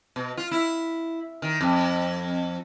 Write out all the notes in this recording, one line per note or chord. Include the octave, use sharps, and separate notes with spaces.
B2
F4
E4
D#3
F2